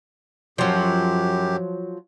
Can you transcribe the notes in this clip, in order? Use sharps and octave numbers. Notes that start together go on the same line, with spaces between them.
F#2 F3 F#3 G4